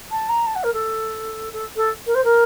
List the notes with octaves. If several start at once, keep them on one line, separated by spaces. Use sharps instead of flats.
A5
A#5
A5
F#5
A#4
A4
A4
A4
A#4
C5
A#4